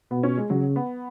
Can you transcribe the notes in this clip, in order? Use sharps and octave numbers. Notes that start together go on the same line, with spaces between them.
B2 B3
C#4
G#3
C#3 F#3
B3